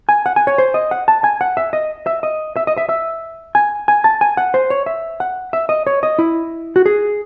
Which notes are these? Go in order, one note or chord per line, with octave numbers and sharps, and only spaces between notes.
G#5
F#5
G#5
C#5
C5
D#5
F#5
A5
G#5
F#5
E5
D#5
E5
D#5
E5
D#5
E5
E5
G#5
G#5
A5
G#5
F#5
C5
C#5
E5
F#5
E5
D#5
C#5
D#5
E4
F#4
G#4